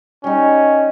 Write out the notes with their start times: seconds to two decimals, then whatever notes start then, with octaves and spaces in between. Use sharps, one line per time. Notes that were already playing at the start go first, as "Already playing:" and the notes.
0.24 G3 C#4 D#4